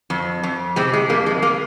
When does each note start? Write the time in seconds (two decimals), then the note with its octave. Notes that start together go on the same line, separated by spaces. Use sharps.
0.10 F2
0.43 F2
0.76 C3 G#3 C4
0.93 G#3
1.09 F2 A#3
1.26 G#3
1.42 A#3